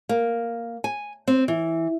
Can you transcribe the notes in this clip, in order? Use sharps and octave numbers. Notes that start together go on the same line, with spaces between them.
A#3
G#5
C4
E3